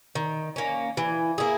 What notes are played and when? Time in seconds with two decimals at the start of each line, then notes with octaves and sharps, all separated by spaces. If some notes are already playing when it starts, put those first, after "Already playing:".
0.15 D#3
0.56 A#3 C#4
0.97 E3
1.38 A#3 E4 G#4